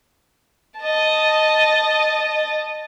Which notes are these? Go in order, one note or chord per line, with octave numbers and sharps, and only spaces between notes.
D#5 A5